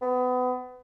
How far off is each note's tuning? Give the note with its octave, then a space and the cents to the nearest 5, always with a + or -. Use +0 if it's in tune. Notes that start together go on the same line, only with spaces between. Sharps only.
B3 +30